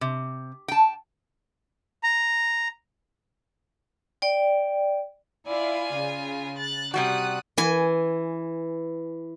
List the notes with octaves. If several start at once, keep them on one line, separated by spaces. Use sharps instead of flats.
C3
G5 A5
A#5
D5 G5
E4 F4 D5 F5 G#5
C#3
F#6 A6
C3 G3 F#4 D5 D#6 F#6
E3 G#5